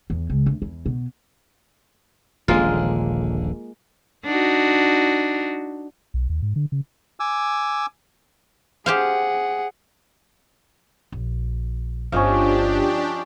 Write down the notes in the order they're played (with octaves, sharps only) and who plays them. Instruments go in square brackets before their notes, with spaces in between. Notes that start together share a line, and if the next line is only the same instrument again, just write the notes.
[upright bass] E2
C#2
D2
E2
B2
[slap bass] D#1 A#1 D3 [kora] G#3 A#3 F4
[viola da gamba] D4 D#4 F#4
[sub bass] B1
D#2
G#2
D3
C#3
[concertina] G#5 D6 E6
[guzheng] G4 C5 F5 [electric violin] G#4 F#5
[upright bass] A#1
[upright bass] G1 [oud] F3 [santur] C#4 D#5 F5 [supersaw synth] D4 G4